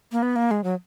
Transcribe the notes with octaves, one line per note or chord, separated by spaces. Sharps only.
A#3
B3
A#3
G#3
F#3